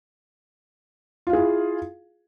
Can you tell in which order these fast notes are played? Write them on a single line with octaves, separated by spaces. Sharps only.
F4 F5 G#4 E4